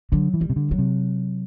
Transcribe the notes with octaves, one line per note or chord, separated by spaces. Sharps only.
D3 F#3
E3
G3
C3
D3
F#3
C3